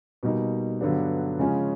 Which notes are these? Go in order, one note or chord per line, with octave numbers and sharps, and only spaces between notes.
B2 G3 A#3 D#4
G2 D3 F#3 B3 D4
C#3 F3 G#3 C#4